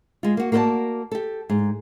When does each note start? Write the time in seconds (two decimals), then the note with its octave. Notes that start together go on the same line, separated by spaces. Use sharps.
0.23 G#3 F4
0.37 A#3 F#4
0.52 A#3 F#4 B4 C5 D5 A5
1.12 G4 A4
1.50 G#2